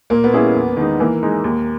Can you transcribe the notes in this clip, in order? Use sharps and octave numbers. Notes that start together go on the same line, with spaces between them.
A#2 A#3
B3
G3 A#3 C#4 E4 G#4
E2
D#3 G#3 D#4
E3 A#3
G#3 D#4
D#2